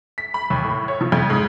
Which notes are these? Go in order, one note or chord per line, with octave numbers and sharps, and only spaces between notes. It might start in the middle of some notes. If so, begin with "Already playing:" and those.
B6
B5
D#2
A2
C#5
F3
F2
G#2